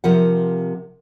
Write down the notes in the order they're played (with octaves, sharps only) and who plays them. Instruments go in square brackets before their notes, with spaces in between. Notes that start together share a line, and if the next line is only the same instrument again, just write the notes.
[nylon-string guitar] C3 F3 A#4 F#5